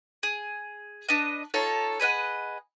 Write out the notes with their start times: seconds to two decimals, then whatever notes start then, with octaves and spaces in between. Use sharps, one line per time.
0.23 G#4
1.09 D4 B4 D#5
1.54 D#4 F4 A4 C#5
2.00 G#4 B4 D#5 F#5